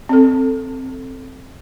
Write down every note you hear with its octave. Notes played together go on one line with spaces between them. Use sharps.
C4 A4